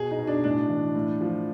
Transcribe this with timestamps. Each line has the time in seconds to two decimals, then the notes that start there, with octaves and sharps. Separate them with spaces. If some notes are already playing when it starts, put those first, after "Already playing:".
Already playing: B2 G#4
0.11 D#4
0.18 B2
0.27 D4
0.44 A2 D4
0.69 E3
0.96 A2
1.21 F3